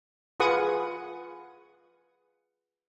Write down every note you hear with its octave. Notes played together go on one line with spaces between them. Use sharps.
F4 G#4 B4 F#5 C#6 D#6